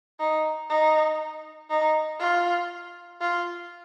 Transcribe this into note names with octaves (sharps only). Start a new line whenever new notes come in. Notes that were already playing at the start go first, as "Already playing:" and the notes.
D#4
D#4
D#4
F4
F4